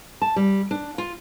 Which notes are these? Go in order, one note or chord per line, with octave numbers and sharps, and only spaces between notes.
A5
G3
D4
F4